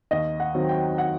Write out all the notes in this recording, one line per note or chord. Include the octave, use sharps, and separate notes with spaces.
D#2 D#5
F#5
D#3 F#3 C4
G5
F#5